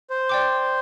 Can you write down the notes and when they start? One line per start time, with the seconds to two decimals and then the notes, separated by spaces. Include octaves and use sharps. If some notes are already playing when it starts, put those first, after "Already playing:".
0.10 C5
0.29 D5 G5 D6